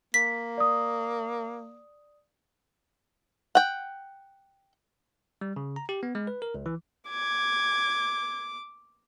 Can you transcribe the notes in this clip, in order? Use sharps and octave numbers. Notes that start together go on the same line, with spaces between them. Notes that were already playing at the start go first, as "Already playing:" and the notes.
A#3 B6
D5 D#6
F#5 G5
G3
C#3
A#5
G4
B3
G#3
B4
A#4
C#2
E3
D6 G#6